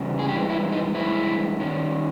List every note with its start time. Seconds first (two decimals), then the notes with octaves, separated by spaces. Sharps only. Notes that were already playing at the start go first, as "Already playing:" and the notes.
Already playing: E2 C#3 G3
0.19 G#4
0.28 G2 E3 G#3 G4
0.50 E4
0.72 D#4
0.94 G2 E3 G#3 E4
1.60 D#3 G3 C#4